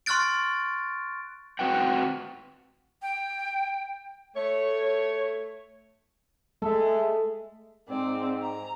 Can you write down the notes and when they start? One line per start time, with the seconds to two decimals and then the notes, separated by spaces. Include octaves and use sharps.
0.06 C6 C#6 F6 F#6 A6 D7
1.59 C4 F#4 B4 F#5 G5
3.02 G5
4.36 A3 C#5
6.62 G#3 A3 A4 E5
7.89 G#2 C4 D5
8.42 A#5